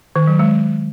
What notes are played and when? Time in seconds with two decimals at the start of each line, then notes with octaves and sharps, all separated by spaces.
0.16 D#3
0.27 F#3
0.39 G#3